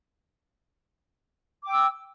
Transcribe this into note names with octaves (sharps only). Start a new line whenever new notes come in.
G5 D6 E6